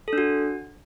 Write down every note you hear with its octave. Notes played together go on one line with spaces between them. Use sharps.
A4
D4
F#4